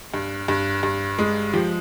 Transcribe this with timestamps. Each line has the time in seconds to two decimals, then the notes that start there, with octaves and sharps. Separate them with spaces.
0.14 G2
0.48 G2
0.83 G2
1.19 G#3
1.53 F3 G4